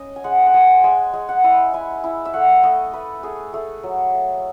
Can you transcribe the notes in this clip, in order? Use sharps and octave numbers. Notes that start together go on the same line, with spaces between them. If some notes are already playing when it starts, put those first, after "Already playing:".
Already playing: C#4 D#5
G#5
G#3 F#5
F#5
G#3 G#5
G#3 G#5
G#3
F#5
E4
E4 G#5
E4
E5
A3 F#5
A3 D#5
A3 B4
A3 G#4
A3 G#4
F#3
A3